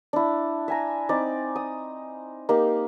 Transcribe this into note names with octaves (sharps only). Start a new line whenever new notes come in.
D4 E4
E5 G#5 A#5
C4 D#4 D5
D#6
A#3 D#4 G4